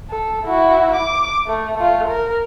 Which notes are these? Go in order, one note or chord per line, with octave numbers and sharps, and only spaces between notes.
A4
E4 F#4
D6
A3
A3 F4
A#4